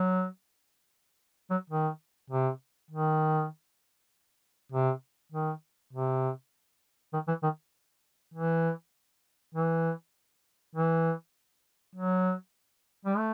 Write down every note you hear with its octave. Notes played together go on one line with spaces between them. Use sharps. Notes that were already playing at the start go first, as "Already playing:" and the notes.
Already playing: F#3
F#3
D#3
C3
D#3
C3
D#3
C3
D#3
E3
D#3
E3
E3
E3
F#3
G3
A3